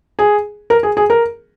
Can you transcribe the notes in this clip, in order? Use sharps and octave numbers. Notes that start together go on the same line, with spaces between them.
G#4
A#4
G#4
G#4
A#4